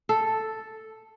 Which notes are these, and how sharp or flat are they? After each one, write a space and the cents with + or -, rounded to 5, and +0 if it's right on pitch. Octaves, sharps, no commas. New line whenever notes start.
A4 +0